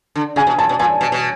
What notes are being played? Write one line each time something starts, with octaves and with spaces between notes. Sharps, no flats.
D3
C#3 G#5
B2
A#2 A5
B2
A#2 G#5
B2
B2